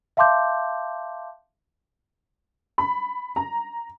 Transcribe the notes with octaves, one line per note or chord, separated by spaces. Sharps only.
E5 F5 A5 C6 D6 G6
B5
A#5